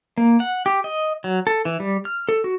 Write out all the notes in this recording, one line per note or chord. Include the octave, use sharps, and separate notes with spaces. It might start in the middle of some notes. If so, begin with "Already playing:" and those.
A#3
F#5
G4
D#5
F#3
A4
E3
G3
F6
A4
F#4